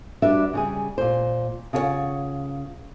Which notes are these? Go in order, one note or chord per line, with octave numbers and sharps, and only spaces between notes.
G3 D4 F#4 B4 E5
C#3 G3 G#4
A#2 C5
C#3 F4 G#4 C5 C#5 F#5